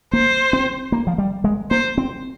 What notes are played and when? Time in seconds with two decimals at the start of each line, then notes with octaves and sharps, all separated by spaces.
0.13 A#3 C5
0.53 C4
0.92 A#3
1.07 F3
1.18 G3
1.44 G#3
1.71 A#3 C5
1.98 C4